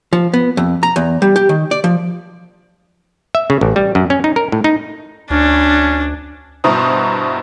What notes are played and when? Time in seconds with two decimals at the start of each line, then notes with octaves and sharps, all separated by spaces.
0.13 F3
0.34 B3
0.57 F2
0.83 A#5
0.96 E2
1.22 G3
1.36 G4
1.49 D#3
1.71 D5
1.84 F3
3.35 E5
3.50 C#3
3.61 A1
3.76 G3
3.95 F#2
4.10 C#4
4.24 D#4
4.36 A#4
4.52 A2
4.64 D#4
5.30 D2 C#4 D4
6.64 G2 B2 E4 C5 A#5 D#6